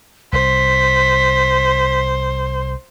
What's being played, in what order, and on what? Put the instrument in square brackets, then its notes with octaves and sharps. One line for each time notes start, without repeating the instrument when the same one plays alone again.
[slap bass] C2 [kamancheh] C5 [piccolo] B6